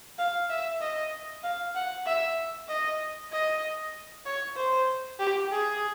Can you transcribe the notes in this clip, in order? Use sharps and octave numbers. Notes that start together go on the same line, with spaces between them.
F5
E5
D#5
F5
F#5
E5
D#5
D#5
C#5
C5
G4
G#4